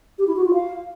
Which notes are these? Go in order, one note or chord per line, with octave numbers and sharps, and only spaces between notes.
G4
E4
F#4
F4
F5